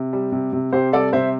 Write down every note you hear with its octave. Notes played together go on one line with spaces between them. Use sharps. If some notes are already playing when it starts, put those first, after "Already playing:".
Already playing: C3
G3
C3
C3
C3 G4 C5
G3 A4 D5
C3 C5 E5